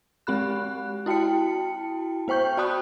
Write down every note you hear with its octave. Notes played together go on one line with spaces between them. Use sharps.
G#3 C4 G4 B5 F#6
E4 F#4 G5 A5 C#7
B3 C5 G5 C#6 G6
F#4 D5 A5 B5 D#6 F#6